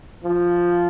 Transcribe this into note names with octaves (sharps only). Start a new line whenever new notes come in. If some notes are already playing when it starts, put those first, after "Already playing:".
F3